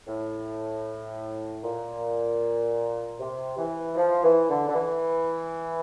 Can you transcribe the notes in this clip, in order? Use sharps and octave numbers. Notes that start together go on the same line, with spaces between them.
A2
A#2
C3
E3
F3
E3
D3
D3
E3